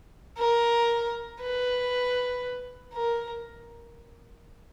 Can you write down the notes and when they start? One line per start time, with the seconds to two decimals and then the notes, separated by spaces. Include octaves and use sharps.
0.38 A#4
1.41 B4
2.94 A#4